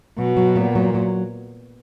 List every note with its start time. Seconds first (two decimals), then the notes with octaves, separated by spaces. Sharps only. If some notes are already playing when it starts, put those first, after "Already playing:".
0.18 B2 F#3
0.37 F#3
0.56 A#2 B3
0.75 F#3
0.94 F#3